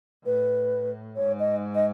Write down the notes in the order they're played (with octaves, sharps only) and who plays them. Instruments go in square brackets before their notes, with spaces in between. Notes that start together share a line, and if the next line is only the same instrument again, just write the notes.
[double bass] A2 [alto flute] B4
[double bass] G#2 [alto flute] C#5
[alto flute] D#5
D#5